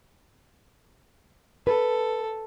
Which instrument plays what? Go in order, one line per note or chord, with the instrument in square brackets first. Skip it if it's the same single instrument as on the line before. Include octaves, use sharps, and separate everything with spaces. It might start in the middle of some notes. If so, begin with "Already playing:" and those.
[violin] A4 [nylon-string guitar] B4